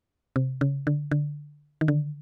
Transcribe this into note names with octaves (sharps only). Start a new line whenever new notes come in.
C3
C#3
D3
D3
D#3
D3